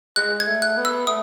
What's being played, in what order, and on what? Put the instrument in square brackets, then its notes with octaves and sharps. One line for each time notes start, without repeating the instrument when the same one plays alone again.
[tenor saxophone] G#3 [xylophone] F#6
[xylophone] G#6
[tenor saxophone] A3
[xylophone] F#6
[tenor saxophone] B3
[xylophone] E6
[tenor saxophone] A3 [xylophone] D#6